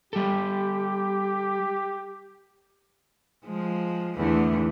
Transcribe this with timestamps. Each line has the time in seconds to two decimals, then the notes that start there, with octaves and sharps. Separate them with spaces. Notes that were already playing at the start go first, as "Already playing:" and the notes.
0.13 G3 G4 A4
3.45 F3 G#3
4.17 E2 D3 A3